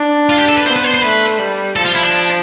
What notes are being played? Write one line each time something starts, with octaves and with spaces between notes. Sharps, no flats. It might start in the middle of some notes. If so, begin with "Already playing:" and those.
Already playing: D4
F4
G4
A4
B4
B3 C5
B4
C5
C5
A3 B4
G3
F3 A4
F4
E4
D4